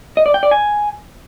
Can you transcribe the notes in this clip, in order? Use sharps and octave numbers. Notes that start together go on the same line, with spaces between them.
D#5
D5
G5
D5
G#5